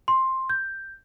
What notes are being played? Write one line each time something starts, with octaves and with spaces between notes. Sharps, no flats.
C6
G6